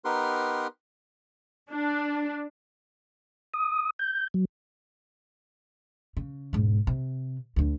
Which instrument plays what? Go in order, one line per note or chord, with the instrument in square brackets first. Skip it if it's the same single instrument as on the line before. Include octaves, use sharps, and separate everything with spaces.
[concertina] B3 D#4 G4 A#4 B4 C6
[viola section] D4
[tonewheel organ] D#6
G6
F#3
[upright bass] C#3
E1 G#2
C3
D2 D3